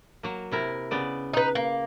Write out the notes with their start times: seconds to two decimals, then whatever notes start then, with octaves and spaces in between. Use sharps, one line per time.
0.23 F#3 A#3
0.52 C3 E4 A#4
0.91 C#3 B3 D5
1.33 D#4 B4
1.55 A#3